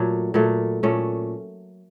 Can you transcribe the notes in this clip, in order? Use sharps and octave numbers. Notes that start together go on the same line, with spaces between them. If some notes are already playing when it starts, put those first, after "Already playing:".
Already playing: A#2 F#3 A3
A#2 F#3 A3
A#2 A3 C#4